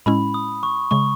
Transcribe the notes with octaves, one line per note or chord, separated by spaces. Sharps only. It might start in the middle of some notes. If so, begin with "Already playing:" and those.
A2 G#3 C#4 E4 B5
D#6
C#6
C#3 G#3 C#6